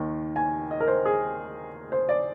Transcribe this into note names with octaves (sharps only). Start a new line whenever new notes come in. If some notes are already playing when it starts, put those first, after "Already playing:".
Already playing: D#2 D#3
G#5
D#5
A#4
C5
G#4
C5
D5